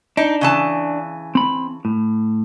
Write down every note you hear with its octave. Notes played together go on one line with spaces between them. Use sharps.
D4 D#4
C#3 E3 A5
C4 B5
A2